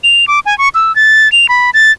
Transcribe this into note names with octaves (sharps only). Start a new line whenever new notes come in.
F7
D6
G#5
C#6
E6
A6
F7
B5
A6